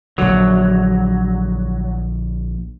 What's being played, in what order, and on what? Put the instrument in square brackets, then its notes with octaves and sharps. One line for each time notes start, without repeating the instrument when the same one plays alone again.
[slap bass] A#1 D3 [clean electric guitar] F#3